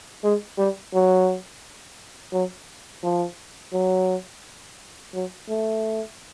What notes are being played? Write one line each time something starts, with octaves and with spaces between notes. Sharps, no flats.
G#3
G3
F#3
F#3
F3
F#3
F#3
A3